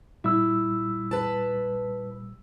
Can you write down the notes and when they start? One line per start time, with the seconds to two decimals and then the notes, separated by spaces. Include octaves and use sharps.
0.24 A#2 G3 E4 E6
1.11 B4 A5